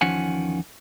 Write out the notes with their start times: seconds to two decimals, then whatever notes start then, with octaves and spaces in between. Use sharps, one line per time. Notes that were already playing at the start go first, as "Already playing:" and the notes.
0.01 E2 D#3 F3 C#4 F#5 G#5